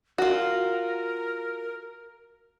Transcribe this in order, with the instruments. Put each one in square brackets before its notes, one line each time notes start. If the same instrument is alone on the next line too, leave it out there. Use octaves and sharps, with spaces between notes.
[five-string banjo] F4 F#4 [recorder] A#4